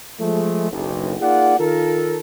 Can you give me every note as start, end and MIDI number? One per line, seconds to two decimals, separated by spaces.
0.20 0.71 53
0.20 0.71 56
0.20 0.71 57
0.71 1.14 30
0.71 1.14 35
1.21 1.58 58
1.21 1.58 63
1.21 1.58 65
1.21 1.58 68
1.21 1.58 74
1.21 1.58 78
1.59 2.19 51
1.59 2.19 65
1.59 2.19 69
1.59 2.19 70